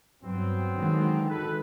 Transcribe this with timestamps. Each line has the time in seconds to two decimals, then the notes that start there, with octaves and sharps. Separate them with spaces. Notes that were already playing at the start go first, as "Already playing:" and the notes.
0.23 G2 F#3 B3 C4
0.77 D3 D#3 G#3
1.29 G#1 A4 B4